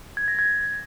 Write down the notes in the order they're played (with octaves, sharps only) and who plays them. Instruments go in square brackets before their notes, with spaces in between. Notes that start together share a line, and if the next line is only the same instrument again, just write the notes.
[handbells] G#6
A#6
G#6